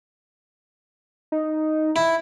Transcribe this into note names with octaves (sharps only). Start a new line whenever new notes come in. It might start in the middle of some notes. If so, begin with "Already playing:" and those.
D#4
E4